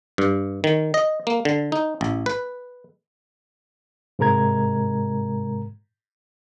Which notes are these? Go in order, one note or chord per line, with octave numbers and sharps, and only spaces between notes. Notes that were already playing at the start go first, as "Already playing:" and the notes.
G2
D#3
D#5
A#3
D3
D#4
A1
B4
G#2 C3 G#3 A#4 A#5 G#6